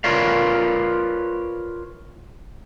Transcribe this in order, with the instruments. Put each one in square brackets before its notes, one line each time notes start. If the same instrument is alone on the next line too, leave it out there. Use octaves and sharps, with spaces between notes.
[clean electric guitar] F4 A#4 B4 C#5 D5 F5